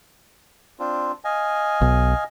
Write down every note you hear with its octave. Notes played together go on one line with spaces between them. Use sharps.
C4 D4 F4
D#5 F5 G#5
B1